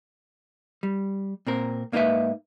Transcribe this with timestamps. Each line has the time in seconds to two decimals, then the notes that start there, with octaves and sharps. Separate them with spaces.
0.83 G3
1.46 A#2 C4 A#4
1.92 G#2 A#3 D#4 G4 B4 E5